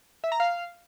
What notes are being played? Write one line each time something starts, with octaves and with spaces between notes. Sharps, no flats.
E5
A#5
F5